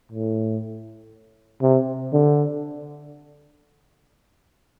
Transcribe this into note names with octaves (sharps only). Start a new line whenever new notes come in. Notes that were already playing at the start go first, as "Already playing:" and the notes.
A2
C3
D3